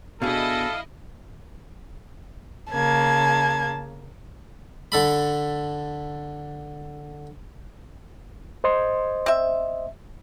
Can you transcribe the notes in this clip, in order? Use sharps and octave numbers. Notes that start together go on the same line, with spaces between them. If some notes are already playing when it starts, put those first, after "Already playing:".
B2 D4 E4 G#4 A4 D#5 F5
C#3 A#3 A5 G#6
D3 A4 B5
C5 D#5 C6
C4 E5